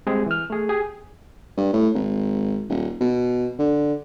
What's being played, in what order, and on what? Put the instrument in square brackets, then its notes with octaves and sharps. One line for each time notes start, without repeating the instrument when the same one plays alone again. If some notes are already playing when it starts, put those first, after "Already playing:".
[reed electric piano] G3 G#3 C4 G4 G#4
E3 F6
A3 G#4
G4 G#4
[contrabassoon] G2
A2
G#1
D#1
B2
D3